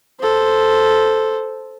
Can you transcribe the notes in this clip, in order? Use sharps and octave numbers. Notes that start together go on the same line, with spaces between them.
A4 C5